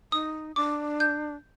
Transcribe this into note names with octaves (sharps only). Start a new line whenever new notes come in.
D#4 D#6
D4 D6
G6